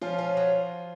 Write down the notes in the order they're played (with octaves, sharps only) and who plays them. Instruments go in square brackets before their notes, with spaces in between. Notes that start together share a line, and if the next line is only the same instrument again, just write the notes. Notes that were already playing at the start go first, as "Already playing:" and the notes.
[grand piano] F3 F4 [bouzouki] C#4
[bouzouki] C#4
F#3